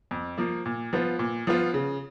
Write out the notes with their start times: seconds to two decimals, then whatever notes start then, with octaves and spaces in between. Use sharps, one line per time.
0.11 F2
0.38 F3 A#3
0.66 A#2
0.93 F3 B3 F4
1.19 A#2
1.47 F3 B3 F4
1.74 C#3